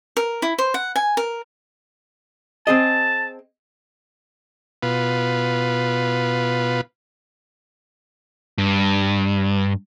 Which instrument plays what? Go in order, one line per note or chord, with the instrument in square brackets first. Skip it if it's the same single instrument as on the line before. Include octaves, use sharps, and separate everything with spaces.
[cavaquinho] A#4
E4
C5
F#5
G#5
A#4
[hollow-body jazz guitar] C4 G#4 D#5 [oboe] A5
[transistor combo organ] B2 F4 B4
[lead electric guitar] G2